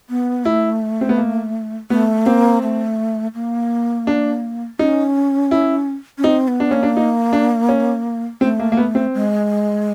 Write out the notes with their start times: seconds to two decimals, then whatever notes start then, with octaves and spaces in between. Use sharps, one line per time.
0.09 B3
0.45 A3 E4
1.01 C4
1.09 B3
1.18 A#3
1.90 A3 B3
2.26 A#3 C4
2.62 A3
3.34 A#3
4.07 D4
4.79 C#4 D#4
5.51 E4
6.18 C#4
6.24 C4 D#4
6.48 B3
6.60 D4
6.71 A#3 C#4
6.83 D4
6.97 D#4
7.33 D4
7.69 C#4
8.41 A3 C4
8.59 A#3
8.72 A#3
8.77 B3
8.95 C4
9.14 G#3